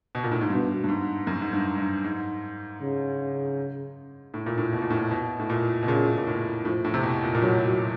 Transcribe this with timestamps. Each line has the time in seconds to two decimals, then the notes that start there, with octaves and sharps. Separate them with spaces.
0.15 B2
0.23 A#2
0.31 A2
0.41 G#2
0.50 G2 B2
0.84 G2
0.88 G#2
1.27 F#2
1.42 G#2
1.53 G2
1.78 G2
2.04 G#2
2.81 C#3
4.34 A2
4.46 A#2
4.58 A2
4.73 B2
4.82 A#2
4.90 A2
4.99 A#2
5.11 B2
5.39 A2
5.50 A#2
5.82 B2
5.88 A#2 C#3
6.18 A#2
6.27 A2
6.64 A2 F3
6.84 A2
6.94 C3
7.03 B2
7.22 A#2
7.35 A#2
7.41 A2 F#3